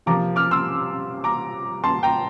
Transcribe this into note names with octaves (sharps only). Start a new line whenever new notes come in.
C3 F3 A#3 A#5 D6
D6 F6
C6 E6
A#5 D6
A5 C6
G5 A#5